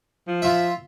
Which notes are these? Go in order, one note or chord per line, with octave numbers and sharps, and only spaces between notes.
F3
F4 E5